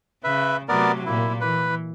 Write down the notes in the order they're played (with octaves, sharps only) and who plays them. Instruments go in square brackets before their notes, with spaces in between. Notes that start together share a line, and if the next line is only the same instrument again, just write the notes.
[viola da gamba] C#3 [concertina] B4 E5
[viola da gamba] C3 F#3 A3 [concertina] B3 A#4 D5
[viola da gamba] A#2 A#3 [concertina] E4
[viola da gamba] E3 [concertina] B4